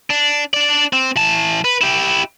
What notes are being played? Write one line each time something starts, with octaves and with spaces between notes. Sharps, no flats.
D4
D4 D5
C4
E3 A5
B4
E4 G4